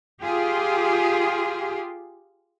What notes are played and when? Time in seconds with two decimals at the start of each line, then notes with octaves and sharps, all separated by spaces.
0.22 F4 G4 G#4